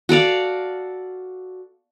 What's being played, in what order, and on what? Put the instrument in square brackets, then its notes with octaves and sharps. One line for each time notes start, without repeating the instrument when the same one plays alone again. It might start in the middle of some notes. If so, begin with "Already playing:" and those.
[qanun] F#4 A4 D5 F5